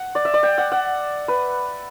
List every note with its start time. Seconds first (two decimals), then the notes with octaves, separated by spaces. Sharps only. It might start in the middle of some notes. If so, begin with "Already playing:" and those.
Already playing: F#5
0.15 D5
0.25 E5
0.34 D5
0.43 G5
0.58 F#5
0.72 F#5
1.28 B4